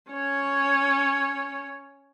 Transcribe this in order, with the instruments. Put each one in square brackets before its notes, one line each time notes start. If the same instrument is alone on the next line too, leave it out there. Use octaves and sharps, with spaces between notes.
[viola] C#4 C#5